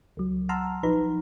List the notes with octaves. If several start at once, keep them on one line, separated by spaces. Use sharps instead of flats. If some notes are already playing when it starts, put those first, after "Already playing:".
C#2 F#3
F#5 A5 A#5 C6 E6 F6
A#1 F3 D#4 B4 A#5